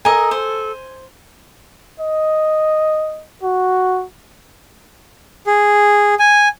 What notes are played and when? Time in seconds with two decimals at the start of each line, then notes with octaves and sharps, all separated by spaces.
0.05 A4 A#4 D#5 G#5
0.31 C5
2.00 D#5
3.43 F#4
5.47 G#4
6.19 G#5